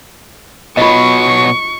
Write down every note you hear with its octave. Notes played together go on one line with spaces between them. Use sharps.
B2 F#3 F4 D#5 C#6